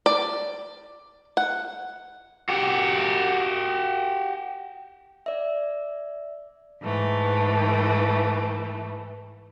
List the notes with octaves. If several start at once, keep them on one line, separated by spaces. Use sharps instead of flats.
D5
F#5
F#4 G4
D5 E5
G#2 E3 A3